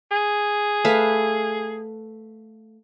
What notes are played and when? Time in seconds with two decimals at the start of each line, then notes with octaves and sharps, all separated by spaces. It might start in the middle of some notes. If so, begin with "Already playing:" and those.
0.11 G#4
0.85 A3 B4 F5